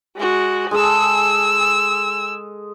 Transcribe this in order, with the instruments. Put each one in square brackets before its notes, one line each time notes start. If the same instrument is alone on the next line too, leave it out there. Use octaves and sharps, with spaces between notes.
[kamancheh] G#3 F#4
[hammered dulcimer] G#3 G#4 A4 [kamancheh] G#5 E6